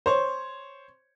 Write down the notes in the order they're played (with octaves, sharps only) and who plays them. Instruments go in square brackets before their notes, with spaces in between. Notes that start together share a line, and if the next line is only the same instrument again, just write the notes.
[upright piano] C5 C#5